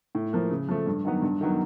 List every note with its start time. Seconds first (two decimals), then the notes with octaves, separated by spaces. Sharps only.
0.15 A2
0.33 F3 A#3
0.51 C#3
0.69 F3 A3
0.87 G2
1.05 D#3 F#3 B3
1.22 G2
1.41 D#3 F#3 B3